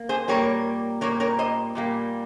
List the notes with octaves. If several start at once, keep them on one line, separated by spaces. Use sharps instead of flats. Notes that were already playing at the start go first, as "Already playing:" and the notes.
Already playing: A#3
G#4 C5
A#2 G3 A#3 A#4 C#5
A#2 G3 A#3 A#4 C#5
A#4 C#5
C5 D#5
A#2 G3 A#3